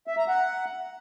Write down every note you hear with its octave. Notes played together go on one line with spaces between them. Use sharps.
E5
A#5
F#5